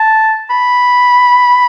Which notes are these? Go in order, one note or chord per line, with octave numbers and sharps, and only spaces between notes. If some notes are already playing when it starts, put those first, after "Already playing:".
Already playing: A5
B5